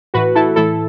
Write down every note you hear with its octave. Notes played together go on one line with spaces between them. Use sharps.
A2 E3 F#4 B4
E4 A4
A2 E3 E4 A4